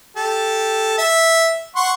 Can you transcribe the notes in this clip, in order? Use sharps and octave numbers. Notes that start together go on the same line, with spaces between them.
G4 A4
E5
F#5 C6 C#6